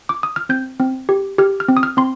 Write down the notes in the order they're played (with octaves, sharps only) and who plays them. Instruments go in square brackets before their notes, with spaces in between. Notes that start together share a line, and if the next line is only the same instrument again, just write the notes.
[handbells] D6
D#6
F6
C4 G6
C4
G4
G4 F6
F6
C4
D#6
F6
C4 C6